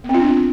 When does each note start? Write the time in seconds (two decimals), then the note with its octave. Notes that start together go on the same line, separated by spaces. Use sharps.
0.04 B3
0.09 C4
0.14 F4
0.20 D4
0.25 C4